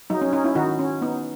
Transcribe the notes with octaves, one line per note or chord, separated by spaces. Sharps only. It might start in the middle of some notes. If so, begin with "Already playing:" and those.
F#3 D#4
C#4
C#4 D#4
C#4 E4
D#3 D#4 F#4
C#4
B3 D#4